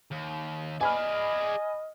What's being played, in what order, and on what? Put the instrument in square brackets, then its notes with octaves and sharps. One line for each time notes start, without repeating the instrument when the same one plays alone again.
[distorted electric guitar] D#2
[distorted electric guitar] G#4 D5 [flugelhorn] D#5 [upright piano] G#5 B5 F6